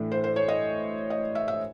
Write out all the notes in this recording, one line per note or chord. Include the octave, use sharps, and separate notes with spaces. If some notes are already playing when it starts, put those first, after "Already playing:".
Already playing: A2 E3 A3 D4
C5
C5
C#5
D#5
D#5
E5
E5